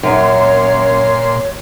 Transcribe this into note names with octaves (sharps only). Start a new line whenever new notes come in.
F#2 A#2 C#5 C6